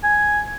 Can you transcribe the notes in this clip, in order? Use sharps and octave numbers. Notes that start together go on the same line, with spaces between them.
G#5